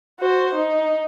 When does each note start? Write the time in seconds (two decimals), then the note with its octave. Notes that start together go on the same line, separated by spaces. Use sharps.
0.20 F#4 C5
0.55 D#4